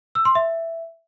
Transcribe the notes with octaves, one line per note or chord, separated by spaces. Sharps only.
E6
C6
E5